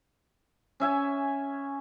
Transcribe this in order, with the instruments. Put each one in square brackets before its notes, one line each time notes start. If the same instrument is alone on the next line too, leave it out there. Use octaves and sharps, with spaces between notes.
[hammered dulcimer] C#4 E5 G#5